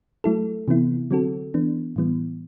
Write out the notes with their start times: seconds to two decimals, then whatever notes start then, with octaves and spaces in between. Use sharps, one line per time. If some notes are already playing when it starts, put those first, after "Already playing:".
0.24 F#3 A3 E4 A4
0.68 C3 E3 B3 E4
1.11 D3 F#3 C4 F#4 A4
1.54 E3 B3 D4
1.96 A2 E3 G3 B3